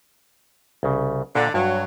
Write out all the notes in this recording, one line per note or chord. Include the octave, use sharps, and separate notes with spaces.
C2 C#3
A#2 D3 C5
G2 F#3